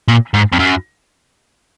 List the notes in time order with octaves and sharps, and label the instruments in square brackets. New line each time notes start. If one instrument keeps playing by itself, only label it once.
[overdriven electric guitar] A#2
G#2
F2
F#2